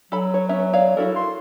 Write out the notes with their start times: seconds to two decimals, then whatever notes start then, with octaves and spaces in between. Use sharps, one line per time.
0.12 F#3 A4 B5
0.34 C#5
0.49 B3 C#4 E5
0.73 C#5 D5 F5
0.97 E4 F#4 A4 A#4
1.16 C6